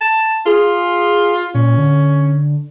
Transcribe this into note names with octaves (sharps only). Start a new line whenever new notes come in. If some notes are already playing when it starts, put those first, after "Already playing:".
A5
F4 G#4
A#2 C#4
D3